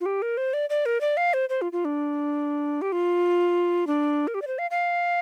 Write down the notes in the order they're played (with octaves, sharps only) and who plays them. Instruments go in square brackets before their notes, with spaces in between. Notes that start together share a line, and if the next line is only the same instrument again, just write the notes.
[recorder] F4
G4
A#4
C5
D5
D5
A#4
D5
F5
C5
C5
F4
F4
D4
G4
F4
D4
A#4
G4
D5
C5
F5
F5